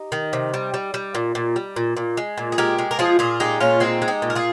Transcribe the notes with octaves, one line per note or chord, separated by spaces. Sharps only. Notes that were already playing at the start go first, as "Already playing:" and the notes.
Already playing: D#4 G4
D#3
C3
G3
G3
G3
A#2
A#2
G3
A#2
A#2
G#3
A#2
G#4
G#3 G4 A#4
G#3
A#4
F3 F4 G#4
A#2 F4 G#4
G#3 D#4 G4
A#2 C#4 F4
G#3 C4 D#4
G#3
D#4 G4
A#2
A#4
F4 G#4